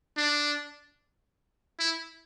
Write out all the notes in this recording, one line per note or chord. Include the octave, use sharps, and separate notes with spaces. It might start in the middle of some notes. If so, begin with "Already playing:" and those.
D4
E4